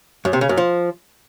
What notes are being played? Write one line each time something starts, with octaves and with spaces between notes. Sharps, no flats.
F#2
C3
C#3
F#2
F3